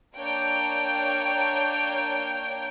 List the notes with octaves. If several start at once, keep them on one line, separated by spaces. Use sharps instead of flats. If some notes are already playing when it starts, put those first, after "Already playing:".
A#3 D4 C#5 G5 G6